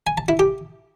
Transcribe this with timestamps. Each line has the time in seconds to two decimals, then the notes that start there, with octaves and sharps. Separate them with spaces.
0.07 G#5
0.18 A5
0.28 E4
0.39 G4